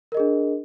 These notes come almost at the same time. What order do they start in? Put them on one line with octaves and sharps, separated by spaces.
A#4 D#5 G#4 D4